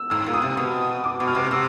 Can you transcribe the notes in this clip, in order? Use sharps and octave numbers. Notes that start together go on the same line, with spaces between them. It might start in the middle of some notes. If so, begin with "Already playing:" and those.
Already playing: E6
G#2 E6
A#2
D#6
C3
B2
D6
B2
F6
C3
C3 E6